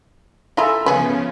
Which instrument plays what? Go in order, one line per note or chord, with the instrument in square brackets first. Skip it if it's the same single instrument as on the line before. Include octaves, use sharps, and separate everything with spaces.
[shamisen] E4 F4 G#4 [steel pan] A4 E5 A#5
[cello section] C#3 F3 B3 [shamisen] G#4 B4